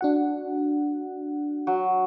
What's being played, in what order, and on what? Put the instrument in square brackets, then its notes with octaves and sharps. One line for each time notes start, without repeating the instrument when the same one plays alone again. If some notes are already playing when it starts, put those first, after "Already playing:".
[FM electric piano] D4 F#4 F#5
[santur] F#3